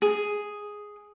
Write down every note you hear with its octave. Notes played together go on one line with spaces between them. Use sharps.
G#4